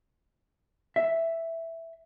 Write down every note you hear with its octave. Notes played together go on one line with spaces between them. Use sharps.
E5